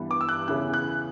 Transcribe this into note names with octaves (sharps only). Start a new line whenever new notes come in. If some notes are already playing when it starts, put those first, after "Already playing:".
Already playing: G2 E3 G3 B3
D6
E6
F#6
E2 C#3 E3 B3 F#6
F#6